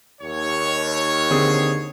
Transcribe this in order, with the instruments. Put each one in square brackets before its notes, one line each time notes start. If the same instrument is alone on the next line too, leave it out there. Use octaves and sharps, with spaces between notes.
[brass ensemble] D#2 C#5
[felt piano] D3 C4 G#4